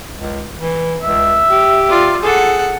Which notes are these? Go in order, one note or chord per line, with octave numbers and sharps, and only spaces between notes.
C#2
E3
C#2 E5
G4
F4 D5
G#4 A4 F#5